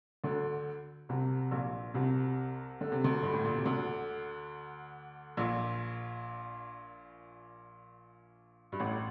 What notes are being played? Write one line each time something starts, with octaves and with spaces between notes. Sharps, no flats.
D2 D3
C2 C3
A#1 A#2
C2 C3
D3
C3
D2 D3
G2
A2
A#2
C3
D2 D3
A#1 A#2
G2
A1 A2